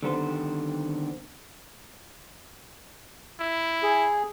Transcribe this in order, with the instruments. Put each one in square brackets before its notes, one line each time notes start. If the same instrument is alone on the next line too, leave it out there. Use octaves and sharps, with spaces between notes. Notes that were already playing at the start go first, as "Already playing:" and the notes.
[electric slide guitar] D3 D#3 G3 B3 C4 C5
[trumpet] E4
[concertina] G#4